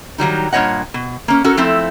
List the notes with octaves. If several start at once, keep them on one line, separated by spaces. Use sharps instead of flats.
D#3 F#3 G3 D#4
G2 A#2 G3 C#5 D#5 F#5
B2
A#3 C#4
C#4 F#4 A4 A#4
F3 A3 C4 E4 A4